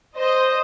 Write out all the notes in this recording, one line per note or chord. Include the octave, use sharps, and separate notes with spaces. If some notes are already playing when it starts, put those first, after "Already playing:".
C5 D#5